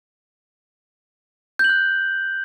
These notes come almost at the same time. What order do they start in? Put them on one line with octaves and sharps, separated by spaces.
G6 F#7 F#6